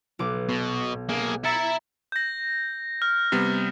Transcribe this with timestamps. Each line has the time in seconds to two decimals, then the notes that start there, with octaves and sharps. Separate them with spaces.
0.19 B1 B4 D6
0.49 B2
1.09 A#3 G#4
1.44 E4 E5 A#5 A6 C#7
2.12 G6 A#6
3.02 F6
3.32 C3 G3 B3